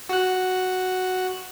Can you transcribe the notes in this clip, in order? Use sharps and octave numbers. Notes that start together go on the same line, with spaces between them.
F#4 F#6